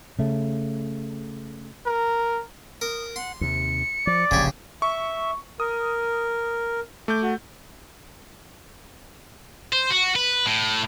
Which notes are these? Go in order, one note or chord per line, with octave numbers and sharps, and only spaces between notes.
C#3 A3
A#4
A#4 D#6
F#5 C6
D#2 C3 C#7
F3 D5
F1 A#1 C#3 G4 G#6
E5 C#6
A#4 D#6
A3 D6 G6
F#4
C5
F#4
B4
A2